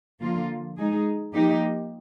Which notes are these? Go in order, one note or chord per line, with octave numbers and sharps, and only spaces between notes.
D3 F3 A#3 F4
G#3 D#4 G#4
F3 A#3 D#4 G4